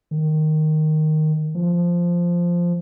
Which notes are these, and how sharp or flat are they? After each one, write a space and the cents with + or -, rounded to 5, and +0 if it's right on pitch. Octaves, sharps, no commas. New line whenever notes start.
D#3 -5
F3 -5